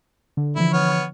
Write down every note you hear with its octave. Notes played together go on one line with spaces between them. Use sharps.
D3
D3 E3 F3 E4
B3 C#5 F6